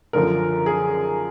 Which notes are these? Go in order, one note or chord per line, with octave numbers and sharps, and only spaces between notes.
F#2 D3 F3 A#4
G#4